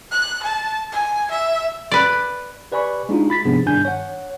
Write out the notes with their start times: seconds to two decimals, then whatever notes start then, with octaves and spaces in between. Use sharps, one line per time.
0.11 F#6
0.43 A5
0.93 G#5
1.31 E5
1.92 B4 D5
2.72 G4 B4 D5 G#5 B5 C#6
3.09 G#3 D4 D#4 F4 F#4
3.30 B5 A6 B6
3.45 G#2 C3 F3 B3 D4 G#4
3.66 G2 D#3 D4 G#5 G6
3.85 C#5 F#5